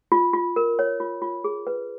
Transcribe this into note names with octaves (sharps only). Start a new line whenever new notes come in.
F4
F4
A#4
C#5
F4
F4
G#4
B4